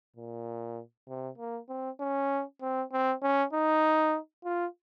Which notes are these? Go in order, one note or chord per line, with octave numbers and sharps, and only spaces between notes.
A#2
C3
A#3
C4
C#4
C4
C4
C#4
D#4
F4